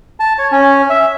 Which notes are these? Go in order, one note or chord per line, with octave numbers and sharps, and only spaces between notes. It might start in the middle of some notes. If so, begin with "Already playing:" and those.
A5
C#5
C#4
E5